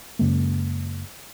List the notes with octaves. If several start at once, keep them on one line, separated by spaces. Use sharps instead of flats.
F#2 C#3 G#3 A#3